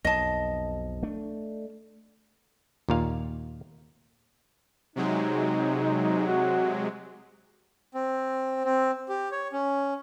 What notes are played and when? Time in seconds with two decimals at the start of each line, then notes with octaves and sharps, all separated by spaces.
0.05 B1 F2 D#5 A5
1.03 A3 D4
2.89 D#2 A#2 F5
4.96 C3 F#3 G#3 D#4
6.27 F#4
7.94 C4
8.64 C4
9.09 G4
9.32 C#5
9.52 C#4